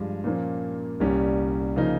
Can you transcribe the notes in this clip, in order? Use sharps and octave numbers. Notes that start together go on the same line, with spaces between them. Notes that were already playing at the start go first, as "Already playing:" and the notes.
Already playing: G2 F3 G#3
A#2 F3 A#3 C#4
C2 A#2 G3 C#4
C#3 F3 A#3 D#4